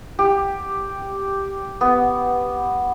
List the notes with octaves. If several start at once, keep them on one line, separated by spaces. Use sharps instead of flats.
G4
B3